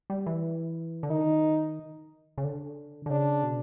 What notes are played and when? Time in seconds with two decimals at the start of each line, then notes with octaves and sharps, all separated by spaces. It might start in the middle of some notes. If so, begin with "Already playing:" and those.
0.10 G3
0.26 E3
1.03 D3
1.09 D#3 D#4
2.38 C#3
2.44 D3
3.06 D3
3.10 C#3 D4
3.43 B2